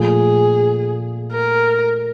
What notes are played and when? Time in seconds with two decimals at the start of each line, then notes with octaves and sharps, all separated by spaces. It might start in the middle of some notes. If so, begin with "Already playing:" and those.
Already playing: A#2 F3 A3 G#4
1.32 A#4